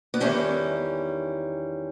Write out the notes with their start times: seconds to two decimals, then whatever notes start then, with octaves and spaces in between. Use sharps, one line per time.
0.14 B3
0.20 E2 D#3 G3 C#4